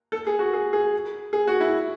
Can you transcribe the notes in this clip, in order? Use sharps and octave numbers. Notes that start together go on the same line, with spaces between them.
A4
G#4
F#4
G#4
G#4
G#4
F#4
E4